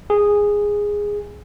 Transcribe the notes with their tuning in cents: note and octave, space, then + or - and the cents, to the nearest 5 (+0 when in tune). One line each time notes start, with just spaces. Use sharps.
G#4 -10